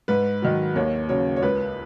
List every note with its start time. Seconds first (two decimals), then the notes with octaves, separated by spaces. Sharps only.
0.08 G#2 B4
0.42 D#3 F#3
0.76 D#2 C#5
1.09 C#3 F#3 C#5
1.36 C#5
1.42 C#2 B4